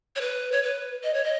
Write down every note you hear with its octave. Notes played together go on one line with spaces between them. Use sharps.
C#5
B4
C#5
B4
D#5
C#5
D#5